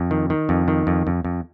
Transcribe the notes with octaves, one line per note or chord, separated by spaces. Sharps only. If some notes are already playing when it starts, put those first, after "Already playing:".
Already playing: F2
D#3
D#3
F2
D#3
F2
F2
F2